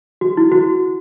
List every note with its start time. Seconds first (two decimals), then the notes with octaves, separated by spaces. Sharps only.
0.21 F#4
0.37 E4
0.51 F#4